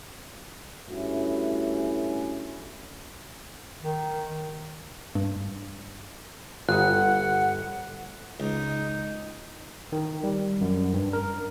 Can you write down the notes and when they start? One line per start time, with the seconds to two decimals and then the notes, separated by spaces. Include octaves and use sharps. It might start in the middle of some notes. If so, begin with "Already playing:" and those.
0.90 G2 A3 C#4 E4 F#4
3.82 D#3
5.15 G2
6.69 G1 F4 F#5 D#6 F#6
8.40 C#2 D#4
9.92 D#3
10.24 G3
10.61 F#2
10.94 G2
11.13 A#4